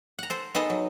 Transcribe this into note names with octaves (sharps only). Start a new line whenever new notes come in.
F#5 A#5
A4 C5
B3 D#4 G#4 A4 D#5
F#3